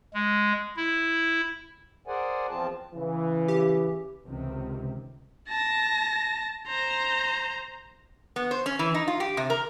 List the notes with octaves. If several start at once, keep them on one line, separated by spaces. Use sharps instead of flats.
G#3
E4
G#4 A#4 C5 D5 F#5 G#5
E2 F3 C4 F4 A5
C#3 E3
G4
C#2 C3 D#3
A5 A#6
C5 A#5
B3
C5
C#4
E3
D#4
F4
G4
C3
A#4